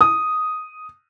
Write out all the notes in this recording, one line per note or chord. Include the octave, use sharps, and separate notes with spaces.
D#6